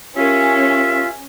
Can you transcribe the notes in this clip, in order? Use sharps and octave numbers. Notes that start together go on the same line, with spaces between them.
C#4 F4 G4 A#4 E5